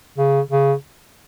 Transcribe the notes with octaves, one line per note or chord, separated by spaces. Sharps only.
C#3
C#3